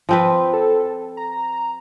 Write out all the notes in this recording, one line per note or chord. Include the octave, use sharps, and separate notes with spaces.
F3 C4 B4
A4
A#5